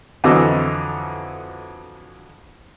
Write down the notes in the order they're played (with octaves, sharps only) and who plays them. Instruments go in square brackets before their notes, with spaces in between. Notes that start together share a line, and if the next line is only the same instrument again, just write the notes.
[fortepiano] F2 D3 E3 F#3 D#5 E6